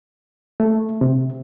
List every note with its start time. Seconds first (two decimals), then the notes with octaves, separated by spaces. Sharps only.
0.60 A3
1.01 C3